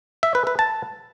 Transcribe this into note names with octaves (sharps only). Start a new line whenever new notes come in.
E5
B4
B4
A5